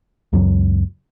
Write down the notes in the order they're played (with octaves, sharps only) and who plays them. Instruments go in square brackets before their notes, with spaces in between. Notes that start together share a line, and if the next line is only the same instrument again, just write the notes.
[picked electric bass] C#2 F#2 F#3